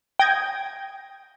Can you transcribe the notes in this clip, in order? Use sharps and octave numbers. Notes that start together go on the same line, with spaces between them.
G5 D#6 G6 G#6 A#6